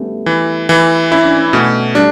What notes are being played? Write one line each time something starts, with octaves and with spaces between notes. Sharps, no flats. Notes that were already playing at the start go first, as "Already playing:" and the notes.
Already playing: G3 A3 B3 C#4 D4
E3
E3
C#4 E4
D4
C#4
B2 A3
G3 D4